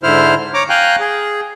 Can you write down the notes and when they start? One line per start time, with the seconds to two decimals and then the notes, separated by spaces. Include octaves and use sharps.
0.03 G#2 D3 E4 C5 F6
0.54 C#5 A#5 D6
0.70 F5 G5 G#5 A#5 F#6
1.00 G#4